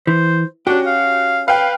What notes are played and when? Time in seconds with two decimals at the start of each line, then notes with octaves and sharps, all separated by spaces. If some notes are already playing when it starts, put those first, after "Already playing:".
0.07 E3 C5
0.67 C#4 D4 F#4 G4
0.87 F5
1.48 B4 F5 G5